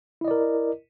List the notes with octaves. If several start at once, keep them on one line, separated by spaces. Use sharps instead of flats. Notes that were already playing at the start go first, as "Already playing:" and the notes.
E4 A#4 D5 D#5